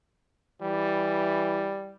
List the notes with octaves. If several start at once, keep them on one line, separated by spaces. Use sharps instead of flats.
E3 G3